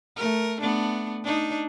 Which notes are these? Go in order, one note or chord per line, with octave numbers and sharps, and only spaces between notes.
A3 A#4
A3 B3 D4
D4 D#4